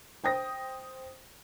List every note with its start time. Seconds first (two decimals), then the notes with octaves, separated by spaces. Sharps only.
0.24 C5 G5 D#6 A#6